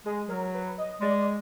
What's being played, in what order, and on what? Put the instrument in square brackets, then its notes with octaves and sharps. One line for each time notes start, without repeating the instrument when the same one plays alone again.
[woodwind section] G#3 [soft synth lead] G#4
[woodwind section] F#3 [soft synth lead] A#4
[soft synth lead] B4
D#5
[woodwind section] G#3 [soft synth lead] D5
[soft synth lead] D5